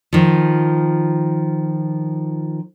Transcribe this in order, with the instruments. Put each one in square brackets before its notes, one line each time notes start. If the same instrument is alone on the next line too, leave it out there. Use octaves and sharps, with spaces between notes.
[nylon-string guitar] D#3 F3